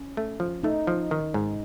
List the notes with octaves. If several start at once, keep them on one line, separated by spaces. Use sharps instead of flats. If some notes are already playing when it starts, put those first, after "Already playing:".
Already playing: C#4
A3
F3
A3 D#4
F3
D#3
G#2